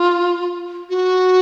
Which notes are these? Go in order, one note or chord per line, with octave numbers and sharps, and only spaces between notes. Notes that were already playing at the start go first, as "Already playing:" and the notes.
Already playing: F4
F#4